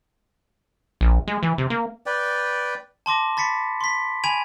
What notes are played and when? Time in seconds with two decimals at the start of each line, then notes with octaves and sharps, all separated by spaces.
1.01 A#1
1.27 G#3
1.43 E3
1.58 C3
1.70 A#3
2.06 B4 D5 G5
3.06 A5 C6 D6 A#6
3.37 B5 A6 B6 C#7
3.81 C6 B6
4.24 G#5 B5 G#6 D7 D#7 F7